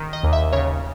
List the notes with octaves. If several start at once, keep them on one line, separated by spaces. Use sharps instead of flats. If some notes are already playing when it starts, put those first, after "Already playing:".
Already playing: D#3
D#5
D#2
E5
C#3 C#5